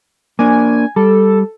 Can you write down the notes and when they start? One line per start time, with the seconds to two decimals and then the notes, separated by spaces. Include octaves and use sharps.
0.39 A#3 D4 G#5
0.96 G3 A4